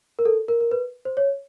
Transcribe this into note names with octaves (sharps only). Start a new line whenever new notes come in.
A#4
A4
A#4
A#4
B4
C5
C#5